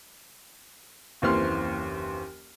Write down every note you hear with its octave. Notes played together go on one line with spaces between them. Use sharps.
F#1 D#2 E3 C4 C6 F6